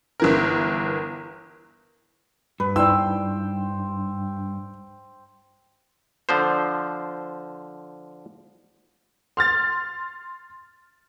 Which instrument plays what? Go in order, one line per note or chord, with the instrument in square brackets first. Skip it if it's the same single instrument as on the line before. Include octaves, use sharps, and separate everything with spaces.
[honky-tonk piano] G1 E3 A#4
[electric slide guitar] G2 [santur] B4
[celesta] D#4 E4 D5 [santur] C5 G5 C#6 [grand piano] E6
[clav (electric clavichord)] D3 F3 C5
[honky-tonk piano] C6 F6 A6